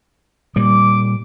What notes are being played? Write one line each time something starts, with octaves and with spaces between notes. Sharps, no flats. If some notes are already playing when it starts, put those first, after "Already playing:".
A#2 G3 D6